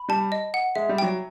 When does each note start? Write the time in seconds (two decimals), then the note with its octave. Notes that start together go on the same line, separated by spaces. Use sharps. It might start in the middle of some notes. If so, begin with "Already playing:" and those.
Already playing: B5
0.09 G3 A5
0.32 D#5
0.54 F#5
0.75 G#3 E5
0.89 G3
0.98 F#3 G5